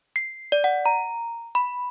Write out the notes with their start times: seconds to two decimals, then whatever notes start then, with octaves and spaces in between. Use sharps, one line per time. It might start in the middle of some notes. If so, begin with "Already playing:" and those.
0.16 C7
0.52 D5
0.64 F#5
0.86 A#5
1.55 B5